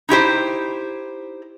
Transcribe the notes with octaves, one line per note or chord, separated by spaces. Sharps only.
D#4 E4 G4 C5